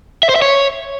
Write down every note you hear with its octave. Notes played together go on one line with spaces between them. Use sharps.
E5
C5
E5
C#5